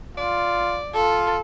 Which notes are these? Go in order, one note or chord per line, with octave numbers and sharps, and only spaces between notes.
F4 D5
F4 A4